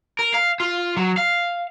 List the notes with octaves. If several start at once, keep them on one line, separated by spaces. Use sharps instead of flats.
A#4
F5
F4
F#3
F5